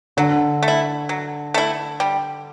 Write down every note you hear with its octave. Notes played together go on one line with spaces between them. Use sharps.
D3 F#3
A3
E4
F#3
A3 E4
G3